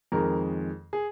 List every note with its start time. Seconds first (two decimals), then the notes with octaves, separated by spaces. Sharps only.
0.12 F2 D#3 G#3 A#4
0.93 G#4